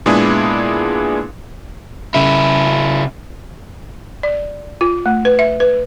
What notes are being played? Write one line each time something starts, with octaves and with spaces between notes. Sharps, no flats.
A#2 G#3 B3 D4 E4 G#4
C#3 E4
D5
F4
A3
B4
E5
B4